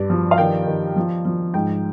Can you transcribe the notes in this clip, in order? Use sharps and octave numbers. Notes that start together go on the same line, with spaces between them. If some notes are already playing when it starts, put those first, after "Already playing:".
Already playing: G2 D5
F3
F5
D#3 G5
D#3
F3
F3
G#2 G5